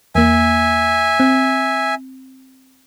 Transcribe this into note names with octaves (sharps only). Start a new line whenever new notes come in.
E2 A#3 E5 G#5
C4